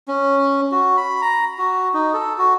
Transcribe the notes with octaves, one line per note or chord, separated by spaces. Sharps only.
C#4
F#4
B5
A#5
F#4
D#4
A4
F#4